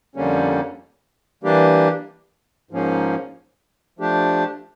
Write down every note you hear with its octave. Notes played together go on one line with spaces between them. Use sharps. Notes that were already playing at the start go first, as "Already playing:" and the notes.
F2 D3 G3 A#3 C#4
E3 G3 A#3 D4 G4
G#2 F3 A#3 C#4
F3 A3 D4 G4